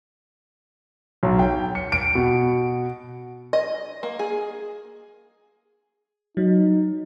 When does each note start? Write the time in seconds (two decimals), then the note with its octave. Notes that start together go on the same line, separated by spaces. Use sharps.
1.23 B1
1.39 G5
1.75 C#7
1.92 D7
2.15 B2
3.53 D#5
4.03 A#3
4.19 G#4
6.37 F#3 D#4